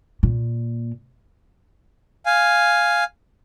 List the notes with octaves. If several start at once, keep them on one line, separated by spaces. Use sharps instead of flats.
A#2
F5 G#5